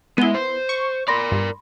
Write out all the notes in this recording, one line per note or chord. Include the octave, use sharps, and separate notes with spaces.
G#3 B3 E4 D#7 G7
C5
C#6
A#4 D5 B5 C6 A#6
G2